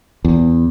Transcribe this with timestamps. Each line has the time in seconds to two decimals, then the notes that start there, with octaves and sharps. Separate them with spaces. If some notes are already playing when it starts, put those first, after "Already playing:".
0.25 E2